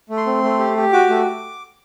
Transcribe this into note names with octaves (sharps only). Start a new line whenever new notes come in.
A3
C6
C4
A3
G4
G4
F#4 D6
A3